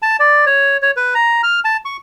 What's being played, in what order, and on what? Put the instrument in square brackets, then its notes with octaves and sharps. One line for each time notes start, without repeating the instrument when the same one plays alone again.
[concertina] A5
D5
C#5
C#5
B4
A#5
F6
A5
C#6